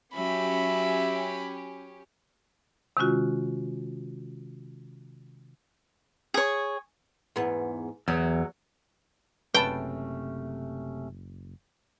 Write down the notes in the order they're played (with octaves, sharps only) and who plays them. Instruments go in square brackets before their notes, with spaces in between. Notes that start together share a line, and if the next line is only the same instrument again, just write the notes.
[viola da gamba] F#3 [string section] C#4 G4 [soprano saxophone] E5 [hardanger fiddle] B5
[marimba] C3 D#3 G#3 C#4 F4 F#4
[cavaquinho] G#4 C#5
[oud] E2 G#2 B3
[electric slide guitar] E2 [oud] F#3
[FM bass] F#1 [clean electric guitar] C3 A3 C#4 [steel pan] B4 A5 [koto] G5